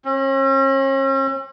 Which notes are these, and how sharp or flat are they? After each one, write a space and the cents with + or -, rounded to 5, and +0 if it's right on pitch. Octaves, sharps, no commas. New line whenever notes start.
C#4 -45